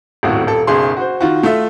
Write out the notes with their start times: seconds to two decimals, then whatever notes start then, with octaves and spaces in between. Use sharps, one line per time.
0.23 D#1 G#1 A2 F#4
0.47 D#1 A4
0.67 F#1 B1 G#4 C6
0.97 F#4 C5
1.21 D#3 F4 F#4
1.43 A3 F4 E5